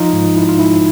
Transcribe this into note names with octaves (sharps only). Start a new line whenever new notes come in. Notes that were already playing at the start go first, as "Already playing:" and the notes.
Already playing: F3 D#4 F4
G#2
E4
F4
G#2 E4